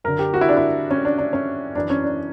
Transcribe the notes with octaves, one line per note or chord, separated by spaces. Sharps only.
F#2 D3 A#4
G4
F#4
E4
D4
E4
C#4
D4
D4
C#4
F#2 E3 D4
C#4
D4